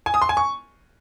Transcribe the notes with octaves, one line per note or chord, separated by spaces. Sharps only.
G#5
D#6
C6
G#5
C#6